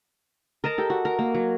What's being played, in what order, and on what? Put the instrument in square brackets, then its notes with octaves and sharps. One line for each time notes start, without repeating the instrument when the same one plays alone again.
[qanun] A#4 D#5 A5 A#5
G4 A4
F#4
A#4
A#3
F#3